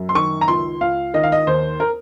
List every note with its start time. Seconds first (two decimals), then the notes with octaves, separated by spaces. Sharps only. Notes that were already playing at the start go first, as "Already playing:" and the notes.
Already playing: F#2
0.09 C6
0.15 D#3 C#6
0.41 A#5
0.47 C#2 C6
0.81 C#2 F5
1.14 D#3 D#5
1.23 F5
1.32 D#5
1.47 D#2 C5
1.80 A#4